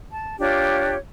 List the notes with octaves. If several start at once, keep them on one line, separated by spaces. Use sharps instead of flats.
A5
D4 F4 G4 C#5